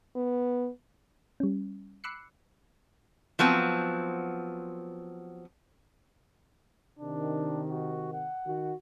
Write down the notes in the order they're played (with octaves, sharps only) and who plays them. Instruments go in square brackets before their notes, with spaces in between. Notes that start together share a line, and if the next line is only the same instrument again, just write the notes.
[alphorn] B3
[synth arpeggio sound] G3 C#4
B5 D6 E6 F#6 C7 C#7
[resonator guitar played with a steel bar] F3 F#3 B3 C4
[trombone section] C3 D#3 [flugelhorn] D4
[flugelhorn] F#4
F#5
[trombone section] D#3 F#4